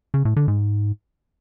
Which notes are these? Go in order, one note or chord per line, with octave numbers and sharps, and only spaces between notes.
C#3
A2
D3
G#2